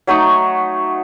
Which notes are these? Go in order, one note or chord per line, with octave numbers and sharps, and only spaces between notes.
F#3 A3 D#4 D#6